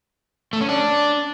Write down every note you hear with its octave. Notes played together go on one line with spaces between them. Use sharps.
A3
C#4
D4